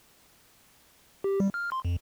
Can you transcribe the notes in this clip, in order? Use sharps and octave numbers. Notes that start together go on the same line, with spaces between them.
G4
G3
F6
C6
F2